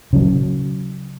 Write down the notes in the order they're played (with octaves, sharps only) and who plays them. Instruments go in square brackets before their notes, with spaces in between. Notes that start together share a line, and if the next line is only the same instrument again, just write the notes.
[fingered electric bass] C#3 F#3